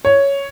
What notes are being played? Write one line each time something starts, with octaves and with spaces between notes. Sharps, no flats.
C#5